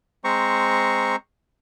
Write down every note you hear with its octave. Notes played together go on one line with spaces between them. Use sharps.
G#3 C4 C5 A#5 C#6